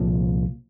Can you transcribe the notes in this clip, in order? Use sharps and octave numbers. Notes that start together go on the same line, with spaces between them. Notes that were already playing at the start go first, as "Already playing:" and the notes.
Already playing: C2 A#2 F3